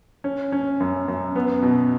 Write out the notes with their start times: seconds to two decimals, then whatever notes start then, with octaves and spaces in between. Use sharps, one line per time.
0.24 C#4
0.52 C#4
0.80 F#2
1.08 F#2
1.36 B3
1.62 B2